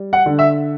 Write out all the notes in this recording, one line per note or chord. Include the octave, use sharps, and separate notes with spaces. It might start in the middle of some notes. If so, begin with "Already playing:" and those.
Already playing: G3
F#5
D3
E5